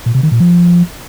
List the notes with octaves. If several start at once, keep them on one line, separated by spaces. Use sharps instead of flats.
A#2
C3
D#3
A#2
F3